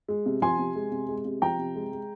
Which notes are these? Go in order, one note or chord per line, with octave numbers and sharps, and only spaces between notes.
G#3
C3
F3 G#5 C6
C3
G#3
C3
G#3
C3
F3 G5 A#5
C3
G#3
G#3